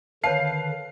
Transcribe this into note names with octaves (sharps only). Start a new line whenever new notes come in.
D3 D#3 B4 C#5 F5 A5 C7